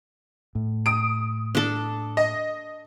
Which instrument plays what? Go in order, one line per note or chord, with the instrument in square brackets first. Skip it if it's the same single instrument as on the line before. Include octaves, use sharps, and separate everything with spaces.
[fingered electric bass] A2
[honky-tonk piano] D#6 D7
[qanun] D4 A4
[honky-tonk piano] D#5